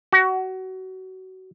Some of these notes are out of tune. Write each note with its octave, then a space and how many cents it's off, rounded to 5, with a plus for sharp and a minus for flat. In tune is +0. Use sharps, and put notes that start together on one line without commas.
F#4 +25